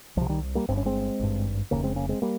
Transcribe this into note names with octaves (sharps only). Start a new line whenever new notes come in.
C2 C3 F3
D#3 G3
G3 A#3
G1 G2 C4
C#4
G#3 C4
G#1 G2
F1 D#2 C#3 A#3 C#4
G#3 C4
A#3 C#4
G#3 C4
G3 A#3